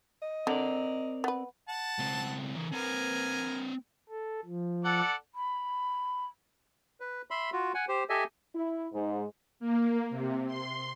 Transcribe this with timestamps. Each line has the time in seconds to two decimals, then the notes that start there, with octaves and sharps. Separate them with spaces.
0.22 D#5
0.47 D3 C4 A#4 D5
1.24 B3 B4
1.69 F#5 A5
1.99 C#2 C4
2.56 E3 A#4
2.72 C4 A#4 B4 G#5
4.09 A4
4.45 F3
4.85 A4 D5 F#5
5.34 B5
7.00 B4
7.30 E5 B5 C6
7.53 F4 F#4
7.74 F#5 G#5
7.88 G4 C5
8.09 G4 A4 D#5 E5 G#5
8.54 E4
8.92 G#2
9.60 A#3
10.10 C3
10.47 C6